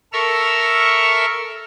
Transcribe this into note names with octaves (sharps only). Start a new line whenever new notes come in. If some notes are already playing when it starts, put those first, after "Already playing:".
A4 A#4 E5 C#6 E6 F6